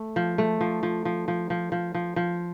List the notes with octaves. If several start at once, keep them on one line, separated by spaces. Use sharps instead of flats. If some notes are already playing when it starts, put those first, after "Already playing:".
Already playing: A3
F3
A3
F3
F3
F3
F3
F3
F3
F3
F3